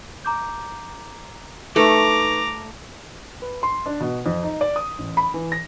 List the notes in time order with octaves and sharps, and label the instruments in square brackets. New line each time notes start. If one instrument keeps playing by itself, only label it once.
[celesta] A#5 D6 G6
[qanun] A3 [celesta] D#4 B4 C#6 [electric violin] A#5 D6
[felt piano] B4
C6
D4
B2
F2
D#4
D5
D#6
A1
B5
E3
A#6